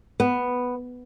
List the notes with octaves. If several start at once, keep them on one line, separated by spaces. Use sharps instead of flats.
B3